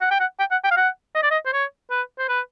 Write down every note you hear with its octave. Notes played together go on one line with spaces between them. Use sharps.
F#5
G5
F#5
G5
F#5
G5
F5
F#5
D#5
D5
D#5
C5
C#5
B4
C5
B4